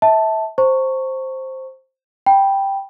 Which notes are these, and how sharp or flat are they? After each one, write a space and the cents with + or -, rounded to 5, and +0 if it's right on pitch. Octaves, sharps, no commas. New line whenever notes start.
E5 -25 A5 +0
C5 +5 A#5 -40 C#6 +0
G5 +0 B5 -15